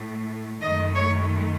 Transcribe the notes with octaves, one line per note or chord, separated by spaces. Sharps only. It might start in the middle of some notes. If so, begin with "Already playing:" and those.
Already playing: A2 A3
F#2 D#3 A3 D#5
C#5